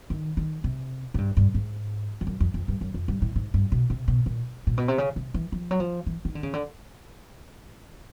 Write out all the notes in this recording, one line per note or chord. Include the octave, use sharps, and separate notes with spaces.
D#3
D#3
C3
G#2
G2
G2
G#2
F2
F#2
F2
F2
G2
F#2
F2
G2
A2
G#2
G2
B2
C3
B2
A#2
A#2
B2
C3
C#3
C3
E3
F3
F#3
F3
E3
D#3
D3
C#3
D3